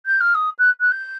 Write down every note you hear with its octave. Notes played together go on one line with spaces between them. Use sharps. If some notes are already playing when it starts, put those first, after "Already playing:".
G6
F6
D#6
F#6
F#6
G6